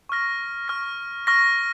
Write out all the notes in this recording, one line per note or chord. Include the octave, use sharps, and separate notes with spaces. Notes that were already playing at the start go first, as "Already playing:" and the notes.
C#6 F6 A#6
C#6 F6 A#6
C#6 F6 A#6